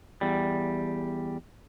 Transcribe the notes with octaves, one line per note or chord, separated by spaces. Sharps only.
E2 G3